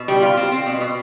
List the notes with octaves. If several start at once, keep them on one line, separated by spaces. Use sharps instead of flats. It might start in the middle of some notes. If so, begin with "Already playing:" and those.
Already playing: B2
G3
F4
C4
C4
B2
B2